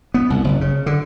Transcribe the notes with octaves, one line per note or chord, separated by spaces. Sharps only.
B3
C2
F#1
C#3
D3